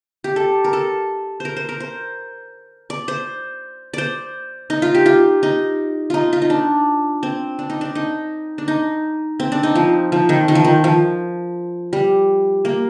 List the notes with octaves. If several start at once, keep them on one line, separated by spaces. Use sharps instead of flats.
G4
A4
A#4
A4
A#4 C5
C5
A#4
C5
D5
C5
C5 D5
D#4
F4
G4
F4
D#4
D#4 F4
F4
D#4
D4
C4
D4
D#4
D4
D#4
D4
D#4
C4
D4
D#4
F3
F3
D#3
D#3
F3
D#3
F3
G3
A#3